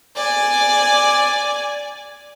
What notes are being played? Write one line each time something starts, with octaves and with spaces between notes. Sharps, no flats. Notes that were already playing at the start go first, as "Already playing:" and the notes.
D5 G#5